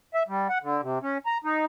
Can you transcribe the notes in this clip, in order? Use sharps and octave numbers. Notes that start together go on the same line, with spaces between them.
E5
G3
F#5
D3
C3
C#4
A#5
D#4